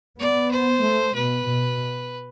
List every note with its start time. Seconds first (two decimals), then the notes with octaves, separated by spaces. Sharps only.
0.19 B3 D5
0.51 C5
0.82 A3
1.15 B2 B4
1.47 B2